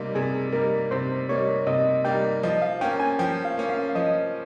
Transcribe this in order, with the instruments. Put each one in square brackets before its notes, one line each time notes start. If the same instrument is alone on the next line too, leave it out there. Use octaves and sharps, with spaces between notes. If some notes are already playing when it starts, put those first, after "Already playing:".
Already playing: [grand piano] C3 G3 A#3 D#4
[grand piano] C3 [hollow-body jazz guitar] G#4
[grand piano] G3 A#3 D#4 [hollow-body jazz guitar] A#4
[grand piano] C3 [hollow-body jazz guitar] C5
[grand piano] G3 A#3 D#4 [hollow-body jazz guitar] C#5
[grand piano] C3 [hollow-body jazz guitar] D#5
[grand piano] G3 A#3 D#4 [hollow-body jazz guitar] G5
[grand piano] F3 [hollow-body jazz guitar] D#5
[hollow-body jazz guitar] F5
[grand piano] A#3 C#4 [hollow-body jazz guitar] G5
[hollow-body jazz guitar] G#5
[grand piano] F3 [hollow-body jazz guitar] G5
[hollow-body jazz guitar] F5
[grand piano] A#3 C#4
[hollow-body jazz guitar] F5
[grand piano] F3 [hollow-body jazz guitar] D#5